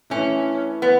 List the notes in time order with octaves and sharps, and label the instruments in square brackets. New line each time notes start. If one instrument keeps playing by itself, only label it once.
[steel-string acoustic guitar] E3 A3 E4 B4 [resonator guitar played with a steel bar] C#4
[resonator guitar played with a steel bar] B3